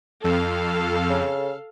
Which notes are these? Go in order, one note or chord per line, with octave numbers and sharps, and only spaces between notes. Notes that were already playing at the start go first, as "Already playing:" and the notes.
F2 A4 F5
C#3